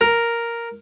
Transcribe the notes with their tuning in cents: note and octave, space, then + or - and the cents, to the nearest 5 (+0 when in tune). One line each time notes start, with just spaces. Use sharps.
A#4 +0